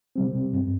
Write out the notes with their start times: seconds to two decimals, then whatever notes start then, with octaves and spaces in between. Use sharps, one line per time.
0.16 C3 G3 C4
0.53 G2